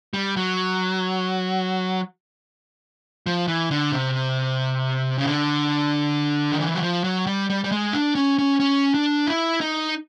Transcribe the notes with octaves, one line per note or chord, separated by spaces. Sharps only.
G3
F#3
F3
E3
D3
C3
C#3
D3
D#3
E3
F#3
F3
F#3
G3
G3
G3
G#3
D4
C#4
C#4
C#4
D4
E4
D#4